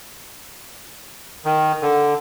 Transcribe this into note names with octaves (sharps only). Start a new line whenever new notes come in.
D#3
D3